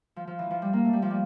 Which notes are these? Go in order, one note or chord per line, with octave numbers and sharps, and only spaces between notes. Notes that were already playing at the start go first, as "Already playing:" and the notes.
F3
F3
E3
F3
G3
A#3
A3
G3
F3
G3